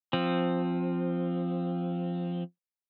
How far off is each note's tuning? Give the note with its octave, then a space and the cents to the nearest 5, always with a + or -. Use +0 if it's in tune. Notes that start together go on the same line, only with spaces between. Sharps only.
F3 +0 C4 +0